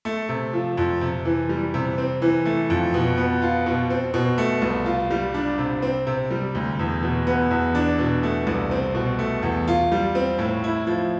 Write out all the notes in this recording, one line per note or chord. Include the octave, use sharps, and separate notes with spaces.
A3
C3
F3
F2
C3
E3
G3
C3
C4
E3
A3
F2
B2
B3
F4
B2
C4
B2
A3
C2
F4
G3
D4
C3
C4
C3
G3
D2
E2
B2
B3
E2
D4
B2
A3
C2
C4
B2
A3
E2
F4
G3
C4
A2
E4
F3